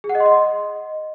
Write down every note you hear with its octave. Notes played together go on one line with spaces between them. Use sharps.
G#4
F#5
D#5
C6
D#5